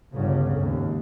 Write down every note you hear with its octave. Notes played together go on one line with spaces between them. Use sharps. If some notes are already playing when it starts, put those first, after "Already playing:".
G1 C#2 C#3
G#1 D#2